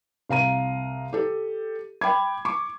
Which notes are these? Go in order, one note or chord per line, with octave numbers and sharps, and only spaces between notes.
C2 F5 A#5 D#7
G4 A4
G5 B5 D6 G#6
C#6 D6